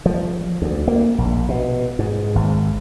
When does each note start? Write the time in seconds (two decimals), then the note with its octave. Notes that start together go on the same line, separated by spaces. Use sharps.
0.06 F3
0.62 D2
0.88 A#3
1.18 A#1
1.49 B2
1.99 G#2
2.35 G#1